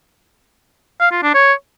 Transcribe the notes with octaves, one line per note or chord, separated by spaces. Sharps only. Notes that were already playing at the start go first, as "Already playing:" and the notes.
F5
F4
D4
C#5